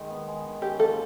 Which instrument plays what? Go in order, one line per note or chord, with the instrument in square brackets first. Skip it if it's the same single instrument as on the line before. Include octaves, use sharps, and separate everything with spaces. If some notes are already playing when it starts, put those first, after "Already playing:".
Already playing: [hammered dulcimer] D#3 G#3
B3
G#3
D#3
[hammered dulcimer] C#4 [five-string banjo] G4
[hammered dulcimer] A#3 [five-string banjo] A4